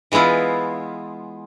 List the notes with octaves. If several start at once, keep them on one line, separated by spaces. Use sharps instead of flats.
E3 G#3 B3 E4 F4